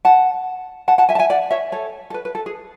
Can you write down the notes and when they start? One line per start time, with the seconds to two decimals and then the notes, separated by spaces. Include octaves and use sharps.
0.05 F#5 A5
0.88 F#5 A5
0.98 F#5 A5
1.09 E5 G#5
1.15 A5
1.19 E5 G#5
1.30 D5 F#5
1.51 C#5 E5
1.72 A4 C#5
2.10 A4
2.14 B4
2.25 B4
2.35 A4
2.46 G#4